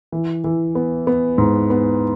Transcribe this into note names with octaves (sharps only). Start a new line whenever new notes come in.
E3
E3
B3
B3
G#2
B3